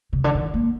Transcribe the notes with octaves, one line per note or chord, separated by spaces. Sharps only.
C3
D3
D#3
A#3